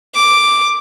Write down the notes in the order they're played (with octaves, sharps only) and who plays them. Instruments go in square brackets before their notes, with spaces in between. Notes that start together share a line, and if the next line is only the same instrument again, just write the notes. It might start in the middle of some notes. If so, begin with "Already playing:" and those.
[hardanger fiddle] D6